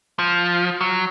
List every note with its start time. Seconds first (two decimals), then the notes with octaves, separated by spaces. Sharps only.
0.19 F3
0.81 F#3